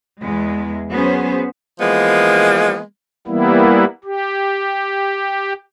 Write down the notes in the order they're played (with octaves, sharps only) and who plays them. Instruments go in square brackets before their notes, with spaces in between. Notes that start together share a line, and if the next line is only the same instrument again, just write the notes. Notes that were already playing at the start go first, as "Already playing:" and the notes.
[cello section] E2 G#3
F#3 B3 C#4 G#4 C5
[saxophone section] E3 F3 G#3 A#3 B3
[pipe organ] E3 G3 A#3 B3 E4
G4